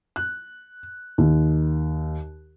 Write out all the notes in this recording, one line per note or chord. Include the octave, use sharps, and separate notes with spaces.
F#6
D#2